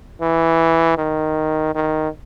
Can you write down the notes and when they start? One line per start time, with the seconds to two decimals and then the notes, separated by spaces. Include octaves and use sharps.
0.21 E3
0.98 D#3
1.75 D#3